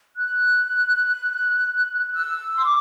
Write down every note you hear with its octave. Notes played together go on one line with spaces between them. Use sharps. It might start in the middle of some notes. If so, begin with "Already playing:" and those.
F#6
E6
C6
D6